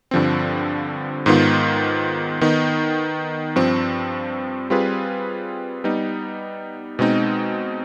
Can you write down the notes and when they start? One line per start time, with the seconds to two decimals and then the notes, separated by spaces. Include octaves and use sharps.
0.11 G2 D3 F3 C4
1.26 G#2 D#3 B3 F4
2.41 D#3 B3 D#4
3.56 G2 F3 C4
4.70 G3 C4 F4 G#4 B4
5.84 G3 B3 D#4
6.99 B2 G#3 C4 D#4